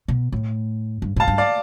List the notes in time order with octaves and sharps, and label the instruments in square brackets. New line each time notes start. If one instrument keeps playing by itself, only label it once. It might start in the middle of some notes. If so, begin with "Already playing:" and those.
[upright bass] B2
A2
G2
[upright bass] A2 [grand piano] F5 A5
[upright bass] G2
[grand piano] D5 F5